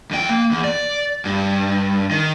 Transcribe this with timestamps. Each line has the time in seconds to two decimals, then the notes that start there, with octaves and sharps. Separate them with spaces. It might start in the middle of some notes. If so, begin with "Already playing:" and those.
0.11 F2 G5
0.29 A#3
0.51 E2
0.64 D5
1.25 G2
2.11 D#3